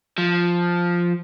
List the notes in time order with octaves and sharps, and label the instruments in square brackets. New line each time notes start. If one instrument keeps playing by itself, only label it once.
[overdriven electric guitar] F3